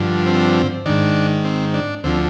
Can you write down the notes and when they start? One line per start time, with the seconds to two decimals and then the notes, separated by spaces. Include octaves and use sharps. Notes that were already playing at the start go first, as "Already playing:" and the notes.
Already playing: G2 D3 F3
0.26 C4
0.86 G#2 D#3 D4
1.44 C4
1.74 D4
2.04 D2 D3 F3 C4